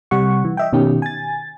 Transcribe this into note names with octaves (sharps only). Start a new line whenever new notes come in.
C3 G3 F#5 C#6
E3
D#5 E5 G5
B2 D#3 C#4 G4
G#5 A6